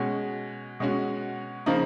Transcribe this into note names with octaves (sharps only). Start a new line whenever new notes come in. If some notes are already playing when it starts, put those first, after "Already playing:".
Already playing: B2 G#3 C#4 F#4
B2 G#3 C#4 F#4
C#3 F3 A#3 D#4